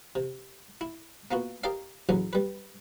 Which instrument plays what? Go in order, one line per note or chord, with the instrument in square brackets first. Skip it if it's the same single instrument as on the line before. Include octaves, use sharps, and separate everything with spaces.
[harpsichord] C3
E4
A#3 B3 F4 F#4
G4 A#4 D5 D#5 F5
A1 F#2 C#3 F#3 C#4
G3 B4